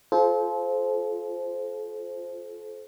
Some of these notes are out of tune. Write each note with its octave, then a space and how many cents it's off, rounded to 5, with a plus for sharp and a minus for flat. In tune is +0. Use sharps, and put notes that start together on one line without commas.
F4 +0 A4 -35 C5 +0